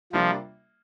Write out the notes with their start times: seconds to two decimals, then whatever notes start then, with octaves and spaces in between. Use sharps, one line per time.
0.13 C3 F3 G3 A#3 D4 F4